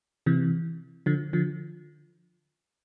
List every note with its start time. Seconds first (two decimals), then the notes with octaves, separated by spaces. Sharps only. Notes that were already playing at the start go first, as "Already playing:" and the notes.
0.26 C3 E3
1.06 D3 F3
1.33 D3 F3